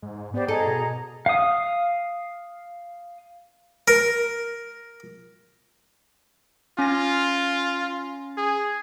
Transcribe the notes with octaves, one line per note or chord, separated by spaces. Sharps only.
G#2
B3 G4 C5 D5
G#2 G#4 A4 D#5 A#5
B2
F5 D#6
A#4
C#4 F4 G#5 A#6
G#4